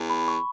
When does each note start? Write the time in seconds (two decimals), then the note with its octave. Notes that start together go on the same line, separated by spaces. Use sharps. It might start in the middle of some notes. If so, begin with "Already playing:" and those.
Already playing: E2
0.10 B5
0.28 C#6